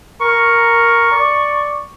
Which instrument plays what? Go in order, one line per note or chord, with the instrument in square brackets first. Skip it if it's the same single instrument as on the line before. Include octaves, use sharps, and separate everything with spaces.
[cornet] A#4 [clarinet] C#6
[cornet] D5